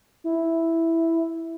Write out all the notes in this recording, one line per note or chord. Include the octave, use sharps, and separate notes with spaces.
E4